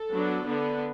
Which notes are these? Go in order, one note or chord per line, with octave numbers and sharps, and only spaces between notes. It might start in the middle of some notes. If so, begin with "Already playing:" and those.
Already playing: A4
F#3 B3 D4
D3 B3 D4